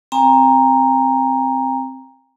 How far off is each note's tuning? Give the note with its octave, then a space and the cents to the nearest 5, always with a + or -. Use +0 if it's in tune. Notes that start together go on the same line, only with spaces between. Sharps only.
C4 +0 G5 +45 A#5 +0